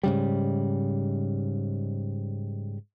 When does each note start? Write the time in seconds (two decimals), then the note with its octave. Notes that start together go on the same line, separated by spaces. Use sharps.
0.03 G#2 C#3 G3